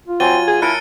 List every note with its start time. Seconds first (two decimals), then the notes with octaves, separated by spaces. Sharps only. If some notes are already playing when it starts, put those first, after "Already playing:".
0.08 F4
0.20 F#3 C4 G#5 A6 D#7 G7
0.47 G#4
0.62 E4 A4 A#4 A5 F#6 C#7 D7